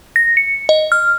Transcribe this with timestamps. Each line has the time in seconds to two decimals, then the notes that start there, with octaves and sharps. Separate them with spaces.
0.16 A#6
0.37 C#7
0.69 D#5
0.92 F6